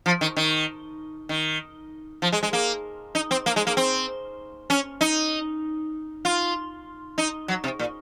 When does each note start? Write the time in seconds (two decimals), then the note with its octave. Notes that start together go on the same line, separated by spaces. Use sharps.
0.06 F3
0.21 D#3
0.37 D#3
1.29 D#3
2.22 F3
2.32 G#3
2.43 G#3
2.53 A#3
3.15 D#4
3.31 C4
3.46 A#3
3.56 G#3
3.67 A#3
3.77 C4
4.70 C#4
5.01 D#4
6.25 F4
7.18 D#4
7.48 F#3
7.64 C3
7.79 A#2